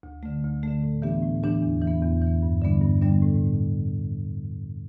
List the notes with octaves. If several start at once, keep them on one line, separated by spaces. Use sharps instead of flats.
D2
D3 A3
D2
D3 A3
A2
E3 B3 D4 G4
A2
E3 B3 D4 G4
E2
E3
B3
E2
E3
B3
G2
D3 G3 B3 D4
G2
D3 G3 B3 D4
A2